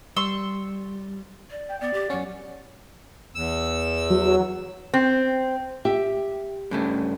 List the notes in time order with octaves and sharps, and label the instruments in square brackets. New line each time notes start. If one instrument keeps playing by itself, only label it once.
[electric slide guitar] G3 [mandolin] C6 C#6 E6
[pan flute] D5
[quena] G5
[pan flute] B3 [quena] D5
[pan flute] G4
[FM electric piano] F#2 C#4 [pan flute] F#5
[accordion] E2 E6
[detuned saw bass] F#3
[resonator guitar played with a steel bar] C4
[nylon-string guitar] G4 [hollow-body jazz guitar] E5
[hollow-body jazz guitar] G2 C#3 A3